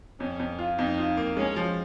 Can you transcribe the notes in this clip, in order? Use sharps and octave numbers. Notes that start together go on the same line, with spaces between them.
F2 C#4
F2
F4
F2 D#4
F4
A#3
G#3 C#4
F3